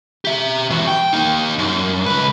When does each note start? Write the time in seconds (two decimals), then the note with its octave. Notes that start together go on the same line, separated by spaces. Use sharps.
0.25 G4 E5
0.70 E3 F#4
0.87 G5
1.13 A#3 D#4
1.59 F#2
2.06 C#2 B4